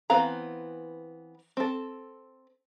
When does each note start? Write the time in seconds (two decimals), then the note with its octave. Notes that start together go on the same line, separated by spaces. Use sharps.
0.10 E3 B3 C4 F5 A#5
1.57 C4 A4